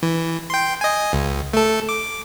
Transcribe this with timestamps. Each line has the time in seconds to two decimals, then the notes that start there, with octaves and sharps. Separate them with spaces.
0.03 E3
0.50 G5 C6
0.81 D#5 G#5
1.13 C#2
1.53 A3 A4
1.89 D6